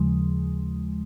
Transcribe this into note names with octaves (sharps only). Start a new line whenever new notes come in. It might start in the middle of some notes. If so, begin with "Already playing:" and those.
Already playing: D#2 C#3 F3 G#3